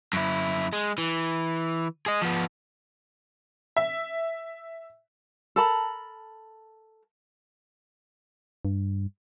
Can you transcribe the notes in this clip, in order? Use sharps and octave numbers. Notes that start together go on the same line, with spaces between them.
F#2 E4
G#3
E3
G#4 D#5
F3 B3
E5
A4 A#4 A5 B5
G2